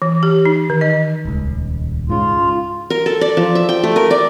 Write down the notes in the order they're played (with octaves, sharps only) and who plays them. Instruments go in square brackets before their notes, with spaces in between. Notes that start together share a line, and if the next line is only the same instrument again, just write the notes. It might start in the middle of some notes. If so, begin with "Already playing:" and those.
[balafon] E3
G4
D#4
D#3
D#5
[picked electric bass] D#1 C#2
[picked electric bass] G#2 C#3 [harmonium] F4
[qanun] A#4
A4
D5
F3
E5
G5
A3
A#4
D5